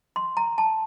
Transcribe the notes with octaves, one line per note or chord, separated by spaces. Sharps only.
C6
A#5
A5